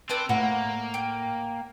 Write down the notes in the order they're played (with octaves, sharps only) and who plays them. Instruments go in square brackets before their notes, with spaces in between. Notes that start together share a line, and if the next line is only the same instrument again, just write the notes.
[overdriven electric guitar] C4 [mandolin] A4 B4 D5
[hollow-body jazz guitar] A2 [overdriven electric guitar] A#3 [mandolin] F#5
[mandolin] G5